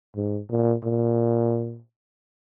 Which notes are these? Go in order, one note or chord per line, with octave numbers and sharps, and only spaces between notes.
G#2
A#2
A#2